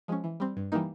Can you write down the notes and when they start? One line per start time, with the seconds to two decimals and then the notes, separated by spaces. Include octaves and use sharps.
0.08 F3 G#3 C#4
0.24 E3
0.40 G3 C4
0.57 G2
0.72 E3 G3 A#3 D#4